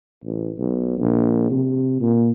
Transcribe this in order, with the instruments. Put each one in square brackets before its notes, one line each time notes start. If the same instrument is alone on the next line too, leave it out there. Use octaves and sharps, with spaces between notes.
[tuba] A1
B1
A#1
C3
A#2